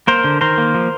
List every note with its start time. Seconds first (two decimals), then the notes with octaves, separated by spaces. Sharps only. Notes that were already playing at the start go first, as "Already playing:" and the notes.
0.07 A#3 A#4 C5
0.24 D3
0.41 D#3 A#4 C5
0.58 A#3
0.74 F3